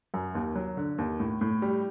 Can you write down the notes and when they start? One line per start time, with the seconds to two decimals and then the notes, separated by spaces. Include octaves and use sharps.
0.14 F#2
0.35 D#2
0.56 F#3
0.77 D3
0.98 D#2
1.20 A2
1.41 A2
1.62 G3